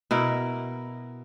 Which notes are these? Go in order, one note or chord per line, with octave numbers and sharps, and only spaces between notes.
B2 E4 A#4